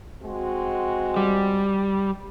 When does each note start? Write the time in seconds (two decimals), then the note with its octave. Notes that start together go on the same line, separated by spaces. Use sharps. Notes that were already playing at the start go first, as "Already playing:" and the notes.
0.22 G#3 C4 F#4
1.17 G3